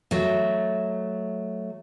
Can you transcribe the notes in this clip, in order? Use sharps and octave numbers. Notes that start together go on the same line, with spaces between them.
F#3 A3